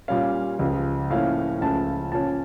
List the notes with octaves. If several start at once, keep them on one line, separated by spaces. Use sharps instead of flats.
A#2 G3 C#4 F5
C#2 C#3 F3
A2 F3 A#3 C#4 F5
C#2 C#3 F3 A3 C#4 A5
A#2 F3 C#4 A5